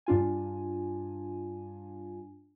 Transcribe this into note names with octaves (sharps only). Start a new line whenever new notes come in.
G2 D4 F4 G#5